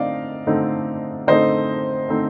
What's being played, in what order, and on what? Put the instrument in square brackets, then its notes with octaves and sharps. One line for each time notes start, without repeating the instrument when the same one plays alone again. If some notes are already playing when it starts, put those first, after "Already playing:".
Already playing: [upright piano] D3 A3 C4 D#4 D5 D#5 F5
D3 A3 C4 D#4
D3 A3 C4 D#4 C5 D#5
D3 A3 C4 D#4